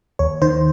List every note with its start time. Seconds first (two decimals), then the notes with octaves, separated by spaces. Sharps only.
0.19 D#2 C#5
0.42 D#3 C5